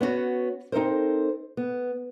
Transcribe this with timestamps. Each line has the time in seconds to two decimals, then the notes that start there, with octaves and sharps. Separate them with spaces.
0.01 B3 C#4 D4 F#4 C#5
0.72 C4 D#4 A4 A#4 C5
1.57 B3